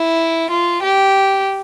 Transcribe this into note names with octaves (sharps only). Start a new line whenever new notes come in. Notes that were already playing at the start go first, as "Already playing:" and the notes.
Already playing: E4
F4
G4